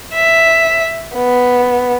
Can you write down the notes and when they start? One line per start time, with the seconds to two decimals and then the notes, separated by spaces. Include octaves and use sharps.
0.14 E5
1.15 B3